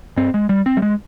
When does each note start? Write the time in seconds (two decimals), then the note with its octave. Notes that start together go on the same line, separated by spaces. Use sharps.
0.17 G2 C4
0.34 G#3
0.49 G3
0.66 C4
0.77 G3
0.82 G#3